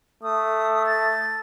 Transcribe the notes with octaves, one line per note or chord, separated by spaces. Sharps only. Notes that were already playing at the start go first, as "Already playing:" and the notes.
A3 D#6
A6